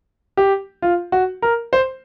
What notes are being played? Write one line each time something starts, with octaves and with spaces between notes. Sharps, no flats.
G4
F4
F#4
A#4
C5